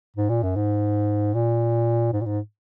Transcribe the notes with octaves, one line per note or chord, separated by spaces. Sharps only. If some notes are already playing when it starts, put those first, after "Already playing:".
G#2
A#2
F#2
G#2
A#2
G#2
A#2
G#2